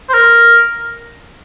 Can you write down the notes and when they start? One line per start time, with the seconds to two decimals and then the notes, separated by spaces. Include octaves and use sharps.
0.09 C5
0.14 A#4